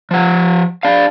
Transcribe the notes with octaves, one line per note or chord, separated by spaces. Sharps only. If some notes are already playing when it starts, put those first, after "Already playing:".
F3 F#5
D4 F5